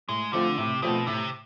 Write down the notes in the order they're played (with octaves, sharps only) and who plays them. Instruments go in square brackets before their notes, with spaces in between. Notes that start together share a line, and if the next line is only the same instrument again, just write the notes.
[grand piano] A2 [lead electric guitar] G#3
[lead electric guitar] D3 [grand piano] F3 A3 C4 F4
[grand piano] A2 [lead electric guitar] C3
[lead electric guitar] B2 [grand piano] F3 A3 C4 F4
[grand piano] A2 [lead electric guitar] C3